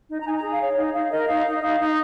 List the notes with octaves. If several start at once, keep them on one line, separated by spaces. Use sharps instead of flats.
D#4
A#5
D#4 G#5
A#5
G#4
F5
C#5
D#4
D#4 F5
A#4 D#5
D#4 F5
D#4
D#5
D#4 F5
D#4